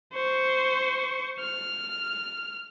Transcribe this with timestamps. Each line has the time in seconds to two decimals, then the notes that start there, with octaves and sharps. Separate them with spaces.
0.13 C5 C#6
1.40 F6